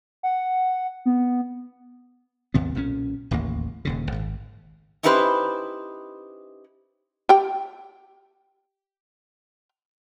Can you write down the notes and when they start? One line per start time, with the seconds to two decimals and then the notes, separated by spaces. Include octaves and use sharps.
0.23 F#5
1.06 B3
2.54 G#1 D#2 C3 B3
2.75 B1 A#2 G3 C#4
3.31 D1 A1 D#2 A#3
3.85 D#1 D#2 C#3
4.12 G#1
5.03 C#4 D#4 E4 G4 B4 C5
7.29 G4 G5